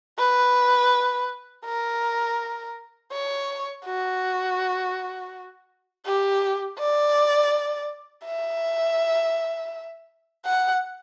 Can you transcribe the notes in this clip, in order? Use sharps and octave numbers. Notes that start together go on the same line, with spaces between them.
B4
A#4
C#5
F#4
G4
D5
E5
F#5